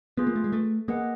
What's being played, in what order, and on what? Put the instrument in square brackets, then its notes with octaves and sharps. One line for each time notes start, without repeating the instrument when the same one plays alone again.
[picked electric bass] B3 [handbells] F4 G#4 B4
[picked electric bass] A#3
A3
G#3
A3
[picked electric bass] A#3 [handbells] G#4 B4 D#5 F#5